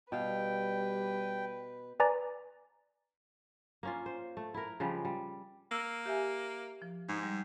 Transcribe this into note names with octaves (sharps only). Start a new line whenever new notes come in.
B2 G3 B4 F5 G5
B4 D5 G#5 A#5 D6 A6
A#3 C#4 F4
C5
A3
E4 A#4
C#3 F3 G3 G#3
G3
A#3 E6
G4 E5 G#5
F3
G#2
G3